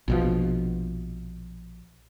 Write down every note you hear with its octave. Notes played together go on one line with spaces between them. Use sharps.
A#1 B2 F3